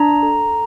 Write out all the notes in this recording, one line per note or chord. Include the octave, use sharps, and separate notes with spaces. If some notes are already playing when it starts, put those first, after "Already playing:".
Already playing: D4 A#5
A4